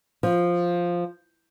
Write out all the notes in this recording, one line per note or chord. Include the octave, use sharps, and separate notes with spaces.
F3